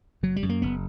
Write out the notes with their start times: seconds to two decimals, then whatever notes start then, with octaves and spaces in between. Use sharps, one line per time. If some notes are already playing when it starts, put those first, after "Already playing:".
0.23 F#1 F#3
0.36 G3
0.43 F#2
0.49 A#3
0.62 F#1 B3